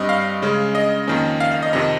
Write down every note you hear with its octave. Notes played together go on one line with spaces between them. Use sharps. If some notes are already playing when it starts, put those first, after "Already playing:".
Already playing: G2 G3 C4 D#5
F5
C#3 G#3 C#4
D#5
F2 D#3 A#3 C#4
F5
F5
D#5
F2 C3 D#3 D#5